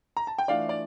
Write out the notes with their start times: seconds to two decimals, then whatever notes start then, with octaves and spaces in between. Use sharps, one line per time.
0.17 A#5
0.27 A5
0.38 G5
0.48 E3 A3 D4 F4 D5 F5
0.69 D5